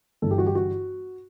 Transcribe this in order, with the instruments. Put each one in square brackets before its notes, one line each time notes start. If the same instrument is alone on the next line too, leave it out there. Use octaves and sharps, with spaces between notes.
[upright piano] G1 G2 E3 A4
G4
F#4
G4
F#4